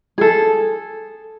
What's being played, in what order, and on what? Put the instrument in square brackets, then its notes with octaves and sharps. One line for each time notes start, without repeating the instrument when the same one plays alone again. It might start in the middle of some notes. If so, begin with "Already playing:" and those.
[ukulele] G#4 A4